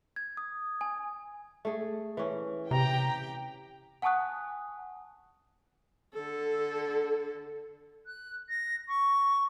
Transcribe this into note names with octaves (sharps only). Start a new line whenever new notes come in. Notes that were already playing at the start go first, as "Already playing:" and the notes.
G#6
D#6
G#5
A3 G#4
E3 C#4
C3 G4 G5 A#5
F#5 G#5 A5 C#6 D#6 F#6
D3 A4
F#6
A#6
C#6